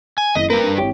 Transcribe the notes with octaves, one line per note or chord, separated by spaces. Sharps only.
G#5
F#1 E4 D#5 B6
G2 A#3 A#4 B4
D4
G#1 E4 G4 C#5